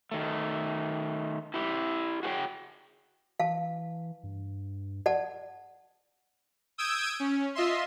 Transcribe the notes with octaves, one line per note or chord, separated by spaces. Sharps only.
D#3 A3
E4 G4
F#4 G#4 B4 C#5 G5
E3 F5 A5
G2
D5 F#5 A5
D#6 E6 G6 G#6 D7
C#4
F4 D#5 E5 C6